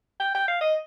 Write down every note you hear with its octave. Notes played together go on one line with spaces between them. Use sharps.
G5
G5
F5
D#5